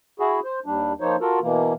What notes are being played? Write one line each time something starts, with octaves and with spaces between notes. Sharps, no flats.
E4 F#4 G#4
C5
D#2 G3 D4
F3 A#3 D#4 C5 C#5
F4 F#4 A4 A#4
B2 E3 A#3